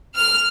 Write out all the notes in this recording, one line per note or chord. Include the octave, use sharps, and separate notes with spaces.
F6